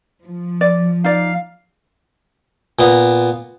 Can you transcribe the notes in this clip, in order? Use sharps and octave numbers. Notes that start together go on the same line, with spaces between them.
F3
D5
D#4 D5 F5
A#2 B3